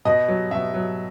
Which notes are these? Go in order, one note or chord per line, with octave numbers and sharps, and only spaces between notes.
B2 D#5
F#3
B2 E5
F#3